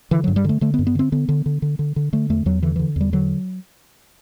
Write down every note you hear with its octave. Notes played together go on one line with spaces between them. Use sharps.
D3 E3
G2 F#3
G3
D3 A3
D3 A3
B3
G2
B3
D3 C4
D3 B3
D3
D3
D3
D3
D3
D3 A3
E2 A3
E2 F#3
D3 E3
D3 E3
E2 G3
D3 F#3